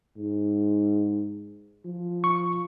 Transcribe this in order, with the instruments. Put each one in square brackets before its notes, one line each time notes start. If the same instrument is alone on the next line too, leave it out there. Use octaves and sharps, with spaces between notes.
[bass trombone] G#2
F3
[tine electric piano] C#6